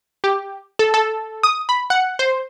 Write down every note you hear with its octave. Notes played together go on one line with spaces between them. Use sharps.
G4
A4
A4
D#6
B5
F#5
C5